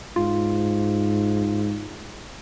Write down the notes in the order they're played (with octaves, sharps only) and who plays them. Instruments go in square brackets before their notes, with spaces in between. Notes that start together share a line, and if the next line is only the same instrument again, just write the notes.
[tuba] G#2 [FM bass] F4